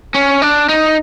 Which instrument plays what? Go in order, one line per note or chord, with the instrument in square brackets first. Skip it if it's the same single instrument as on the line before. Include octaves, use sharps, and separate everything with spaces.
[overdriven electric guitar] C#4
D4
D#4